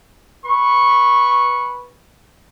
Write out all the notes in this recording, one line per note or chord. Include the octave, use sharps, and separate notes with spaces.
B4 C#6